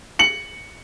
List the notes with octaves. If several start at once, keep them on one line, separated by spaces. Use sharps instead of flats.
C#7 F#7